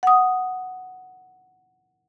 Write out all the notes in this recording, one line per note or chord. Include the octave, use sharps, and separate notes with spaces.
F#5 D#6